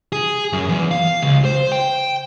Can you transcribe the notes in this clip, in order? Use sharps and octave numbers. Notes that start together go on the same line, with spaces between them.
G#4
F#2
E2
F5
C#2
C5
G5